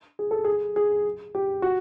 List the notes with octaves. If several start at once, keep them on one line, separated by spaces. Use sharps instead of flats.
G#4
A4
G#4
G#4
G4
F#4